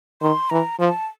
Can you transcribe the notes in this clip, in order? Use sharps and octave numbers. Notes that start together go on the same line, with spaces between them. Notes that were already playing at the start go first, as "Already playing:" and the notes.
D#3 C6
E3 A#5
F3 A5